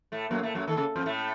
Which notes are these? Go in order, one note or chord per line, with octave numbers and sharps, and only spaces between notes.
A2 A3
F#2 F#3 A#3
A2 A3
F#2 F#3
D#3 A4
C#3
F2 F3
A2 A3